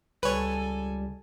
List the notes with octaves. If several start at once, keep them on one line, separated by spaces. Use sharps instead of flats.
C#2 G3 A4 B4 C#5 G#5